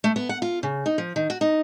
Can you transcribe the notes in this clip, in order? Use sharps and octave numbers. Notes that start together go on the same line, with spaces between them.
A3
B3
F#5
F4
C#3
D#4
F3
D#3
F#4
D#4